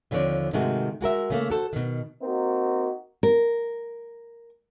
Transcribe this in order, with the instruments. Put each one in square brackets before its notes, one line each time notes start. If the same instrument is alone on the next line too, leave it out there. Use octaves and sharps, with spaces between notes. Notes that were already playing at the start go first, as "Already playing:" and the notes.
[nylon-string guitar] D#2 D3 F3 C4 C#5 D5
G#2 C3 D#3 G#3 A3 F#4
G#3 F#4 A#4 E5
C#3 A3 A#3
F#4 A4 C5
B2 D#3
[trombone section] A#3 C4 D#4 F#4
[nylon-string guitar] A#4